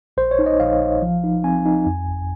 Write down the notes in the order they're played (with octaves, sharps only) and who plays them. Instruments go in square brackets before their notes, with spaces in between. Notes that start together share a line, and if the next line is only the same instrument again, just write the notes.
[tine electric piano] A#1 C5
C#5
D#4
D#5
A#1 F5
A#1
F3
D#4
C4 G#5
D#4
F2
G1